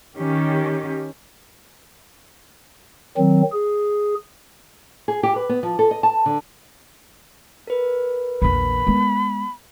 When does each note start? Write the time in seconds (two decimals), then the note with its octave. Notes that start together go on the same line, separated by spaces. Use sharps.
0.16 D#3 C#4 G4
3.18 D#3 F#3 C4
3.52 G#4
5.08 G#4
5.23 G4
5.36 B4
5.49 B3
5.63 F3
5.79 A4
5.91 D#5
6.03 A5
6.26 D3
7.67 A#4 B4
8.42 A#1 E2 B5
8.87 G#3 B3